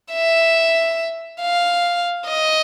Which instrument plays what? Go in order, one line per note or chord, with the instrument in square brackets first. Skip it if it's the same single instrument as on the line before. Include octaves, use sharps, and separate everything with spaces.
[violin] E5
F5
D#5